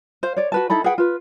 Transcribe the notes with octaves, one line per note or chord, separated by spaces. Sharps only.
C5 F5
C#5 D5
F#4 B4 A5
D#4 E4 A4 B5
G#4 B4 F#5 G5
F4 B4